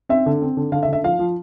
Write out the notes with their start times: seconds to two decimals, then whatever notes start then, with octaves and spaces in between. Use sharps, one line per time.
0.09 C4 E5
0.26 D3
0.42 C4
0.57 D3
0.72 D3 F5
0.83 E5
0.88 D3
0.93 E5
1.04 F3 F5
1.19 F3